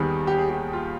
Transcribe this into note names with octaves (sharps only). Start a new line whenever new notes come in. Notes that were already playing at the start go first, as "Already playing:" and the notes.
Already playing: D#2 D#3 G3 B3 G#4
G4
G#4
G4
F4